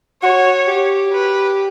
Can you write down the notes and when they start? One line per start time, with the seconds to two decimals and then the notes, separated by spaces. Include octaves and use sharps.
0.23 F#4 C#5
0.68 G4
1.13 B4